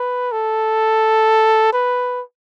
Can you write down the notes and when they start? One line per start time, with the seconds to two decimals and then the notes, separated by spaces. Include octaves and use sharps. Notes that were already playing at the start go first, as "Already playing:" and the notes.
Already playing: B4
0.32 A4
1.73 B4